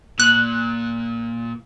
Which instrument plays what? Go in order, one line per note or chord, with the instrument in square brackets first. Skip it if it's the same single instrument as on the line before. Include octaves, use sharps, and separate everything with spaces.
[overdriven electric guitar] A#2 [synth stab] F#6